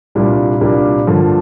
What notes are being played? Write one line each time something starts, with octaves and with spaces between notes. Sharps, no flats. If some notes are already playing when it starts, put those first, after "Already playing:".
C2 A#2 G3 A#3 D4
C2 A#2 G3 A#3 D4
G2 D3 F3 A#3